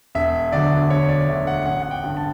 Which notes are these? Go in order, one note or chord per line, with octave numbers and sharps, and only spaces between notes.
E1 E5
D2 D3 F#3 D5
E1 C#5
D5
D2 D3 F#3 E5
F#5
A1 F#5
F#5
G5
G2 D3
A5